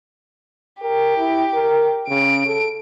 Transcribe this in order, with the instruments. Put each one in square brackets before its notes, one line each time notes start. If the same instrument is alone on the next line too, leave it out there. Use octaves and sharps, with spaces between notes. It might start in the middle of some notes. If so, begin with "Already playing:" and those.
[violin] G4 [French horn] A#4
[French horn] E4
A#4
[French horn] C#3 [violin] D7
[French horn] A4